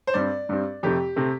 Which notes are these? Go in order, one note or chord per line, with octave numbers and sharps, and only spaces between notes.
C5
G2 G3 C4 D5
G2 G3 C4
F2 C3 A3 C4 G4
C3 A3 C4